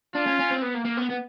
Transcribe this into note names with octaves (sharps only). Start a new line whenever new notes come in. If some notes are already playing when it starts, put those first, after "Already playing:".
D4 F4
C#4
C#4
C4
B3
A#3
A#3
B3
B3